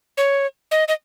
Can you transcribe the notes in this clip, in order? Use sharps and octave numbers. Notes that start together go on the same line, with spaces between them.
C#5
D#5
D#5